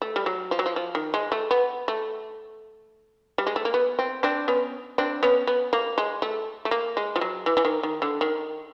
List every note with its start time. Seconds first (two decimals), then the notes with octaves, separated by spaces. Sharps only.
0.02 A3
0.16 G3
0.26 F#3
0.51 F3
0.59 F#3
0.66 F3
0.76 F3
0.95 D#3
1.14 G#3
1.32 A3
1.51 B3
1.88 A3
3.38 G3
3.47 G#3
3.56 A3
3.65 A#3
3.74 B3
3.99 C4
4.23 C4 D4
4.48 B3 C#4
4.98 C4 D4
5.23 B3 C#4
5.47 B3
5.73 A#3
5.98 G#3
6.22 A3
6.65 A3
6.71 A#3
6.97 G#3
7.16 F3
7.21 F#3
7.46 E3
7.57 E3
7.65 D#3
7.83 D#3
8.02 D3
8.21 D#3